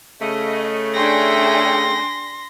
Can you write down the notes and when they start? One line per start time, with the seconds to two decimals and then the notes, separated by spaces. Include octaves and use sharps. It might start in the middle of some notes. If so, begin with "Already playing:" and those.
0.21 C#3 A3 D#5
0.94 D4 G#4 G5 C6 A#6